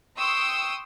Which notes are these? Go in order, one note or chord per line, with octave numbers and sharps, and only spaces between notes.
G5 C6 C#6 D#6 E6